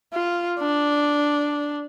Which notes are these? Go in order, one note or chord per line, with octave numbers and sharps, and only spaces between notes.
F4
D4